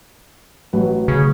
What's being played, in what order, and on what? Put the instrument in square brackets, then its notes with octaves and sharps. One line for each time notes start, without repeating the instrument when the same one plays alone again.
[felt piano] A1 F#3 B4
[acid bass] C#3